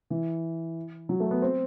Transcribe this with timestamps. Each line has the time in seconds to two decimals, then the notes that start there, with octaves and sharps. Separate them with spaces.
0.10 E3
1.09 F#3
1.20 A3
1.31 B3
1.42 C4